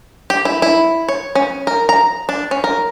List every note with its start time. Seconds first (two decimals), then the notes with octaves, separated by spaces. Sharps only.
0.30 G4
0.45 E4
0.62 E4
1.09 C#5
1.35 C#4
1.67 A#4
1.89 A#5
2.29 D4
2.51 C#4
2.64 A#4